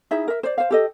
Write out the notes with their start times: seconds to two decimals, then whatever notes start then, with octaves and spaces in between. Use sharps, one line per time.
0.11 D#4 E4 G#4 E5
0.28 A#4 E5
0.43 C5 D5
0.58 C5 F5
0.71 G4 A4 D#5